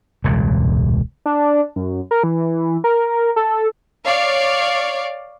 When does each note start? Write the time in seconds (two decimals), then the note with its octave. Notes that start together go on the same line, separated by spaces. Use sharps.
0.24 E1 C#2 G2 A#2
1.26 D4
1.76 F#2
2.11 A#4
2.24 E3
2.84 A#4
3.36 A4
4.05 C#5 D5 F5